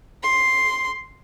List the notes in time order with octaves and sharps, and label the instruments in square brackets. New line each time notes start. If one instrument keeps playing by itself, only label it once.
[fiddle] C6